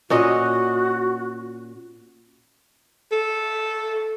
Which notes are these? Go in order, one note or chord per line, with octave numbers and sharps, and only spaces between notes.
A#2 C#4 F#4 D#5
A4